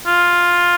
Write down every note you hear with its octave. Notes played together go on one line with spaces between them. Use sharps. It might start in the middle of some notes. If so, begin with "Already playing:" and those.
F4